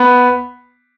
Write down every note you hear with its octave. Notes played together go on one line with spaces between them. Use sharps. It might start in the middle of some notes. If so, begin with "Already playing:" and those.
Already playing: B3